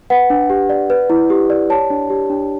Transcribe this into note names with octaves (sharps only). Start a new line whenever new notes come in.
B4 F#5
D4
G4
D5
B4
E4
G4
D5
C#5 A5
D4
G4
D4